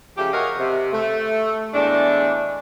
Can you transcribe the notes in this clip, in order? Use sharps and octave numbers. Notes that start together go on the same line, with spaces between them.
C#3 F3 A3 G4
F#4 G#4 A#4 C#5 D#5 F5
C3
A3
E2 A2 G#3 A3 D4